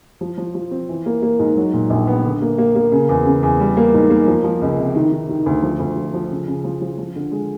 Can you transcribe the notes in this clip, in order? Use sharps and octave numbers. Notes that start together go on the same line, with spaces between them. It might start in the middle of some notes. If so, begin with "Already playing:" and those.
F3
F3
F3
C4
E3
A#3
A#3
G#2
F#3
A#2
A#1
B3
D3
A#3
A#3
A#3
C#3
E2
C#3
E2
G3
A#3
G#2
A#3
F3
F3
C#2
C3
D#3
D#3
D#3
D2
F3
D2
F3
F3
C#3
C#3
F3
F3
F3
D3
G#3